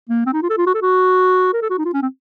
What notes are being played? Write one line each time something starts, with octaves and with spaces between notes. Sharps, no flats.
A#3
C4
D#4
F4
A4
F4
F#4
A4
F#4
A#4
A4
F#4
D#4
F4
C#4
C4